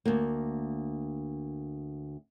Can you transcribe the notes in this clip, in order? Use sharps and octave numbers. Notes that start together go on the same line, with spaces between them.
D2 A#3